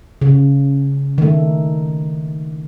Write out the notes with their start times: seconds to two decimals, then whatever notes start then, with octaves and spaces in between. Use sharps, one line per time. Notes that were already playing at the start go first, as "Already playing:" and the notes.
0.21 C#3
1.18 D#3 A3